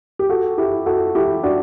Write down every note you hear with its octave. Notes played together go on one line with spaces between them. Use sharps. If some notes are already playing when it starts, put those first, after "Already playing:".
G4
F#4 A4
E4 G4
F#4 A4
E4 G4
D4 F#4